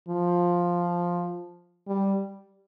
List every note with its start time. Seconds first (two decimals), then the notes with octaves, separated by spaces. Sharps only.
0.09 F3
1.88 G3